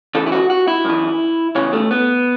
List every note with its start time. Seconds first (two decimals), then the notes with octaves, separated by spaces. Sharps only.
0.15 E2 C#3 E3 A4
0.26 E4
0.32 F#4
0.50 F#4
0.68 E4
0.84 F#2 E3
1.55 E2 C#3 E3 C#4
1.73 A3
1.91 B3